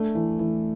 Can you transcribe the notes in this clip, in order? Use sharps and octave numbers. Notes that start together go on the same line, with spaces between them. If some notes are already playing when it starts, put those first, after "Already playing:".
Already playing: A3 D4
E3
E3